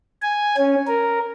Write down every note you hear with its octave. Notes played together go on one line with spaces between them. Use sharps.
G#5
C#4
A#4